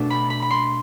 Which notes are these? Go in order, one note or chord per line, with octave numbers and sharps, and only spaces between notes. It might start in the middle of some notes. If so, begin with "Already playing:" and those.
Already playing: B2 A3 D4
B5
B5
B5
C6